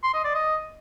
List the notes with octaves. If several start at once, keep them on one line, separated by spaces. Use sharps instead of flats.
C6
D#5
D5
D#5